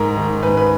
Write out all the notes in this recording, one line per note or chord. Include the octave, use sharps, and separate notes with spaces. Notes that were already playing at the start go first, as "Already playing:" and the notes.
Already playing: G#2 A#4
D#3
G#2 B4
B4